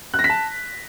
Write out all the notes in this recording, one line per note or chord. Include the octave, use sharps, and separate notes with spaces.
F#6
A#6
B6
A5